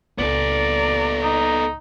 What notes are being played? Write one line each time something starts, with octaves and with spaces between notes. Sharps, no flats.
C#2 A#2 B3 A4 D5 A#5
D#4